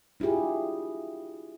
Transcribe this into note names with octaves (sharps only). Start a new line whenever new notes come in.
D4 E4 F4 G4 G#4